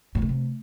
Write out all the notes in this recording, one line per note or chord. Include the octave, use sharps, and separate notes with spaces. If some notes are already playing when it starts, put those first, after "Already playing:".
A2
A#2
C3